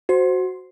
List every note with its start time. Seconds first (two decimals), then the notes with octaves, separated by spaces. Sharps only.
0.09 F#4 C5